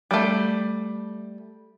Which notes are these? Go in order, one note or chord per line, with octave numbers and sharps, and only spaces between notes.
G3 A3